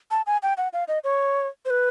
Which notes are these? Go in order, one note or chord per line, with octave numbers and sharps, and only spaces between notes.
A5
G#5
G5
F#5
F5
D#5
C#5
C5
B4